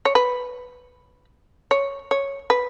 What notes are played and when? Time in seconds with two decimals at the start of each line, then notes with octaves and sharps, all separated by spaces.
0.05 C#5
0.15 B4
1.71 C#5
2.11 C#5
2.50 B4